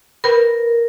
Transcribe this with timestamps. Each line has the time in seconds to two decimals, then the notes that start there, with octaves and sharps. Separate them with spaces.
0.24 A#4 B4 B5